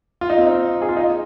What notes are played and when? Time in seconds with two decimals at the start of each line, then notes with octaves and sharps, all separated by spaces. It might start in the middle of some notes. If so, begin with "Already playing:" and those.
0.21 F4
0.30 D#4
0.38 C4
0.47 D#4
0.82 G#4
0.89 F4
0.97 D#4